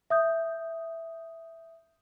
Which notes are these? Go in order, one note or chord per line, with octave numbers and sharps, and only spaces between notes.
E5 D#6 G6